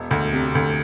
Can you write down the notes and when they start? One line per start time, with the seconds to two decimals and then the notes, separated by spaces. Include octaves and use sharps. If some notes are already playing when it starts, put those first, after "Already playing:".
Already playing: E1
0.11 D2
0.33 C3
0.55 D2